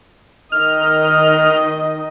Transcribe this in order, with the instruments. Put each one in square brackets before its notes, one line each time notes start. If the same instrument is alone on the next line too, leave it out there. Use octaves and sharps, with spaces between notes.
[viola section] D#3 D#5 [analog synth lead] F6